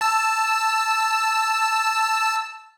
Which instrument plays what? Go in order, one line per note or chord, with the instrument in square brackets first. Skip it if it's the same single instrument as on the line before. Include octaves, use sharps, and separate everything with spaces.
[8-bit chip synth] A5 E6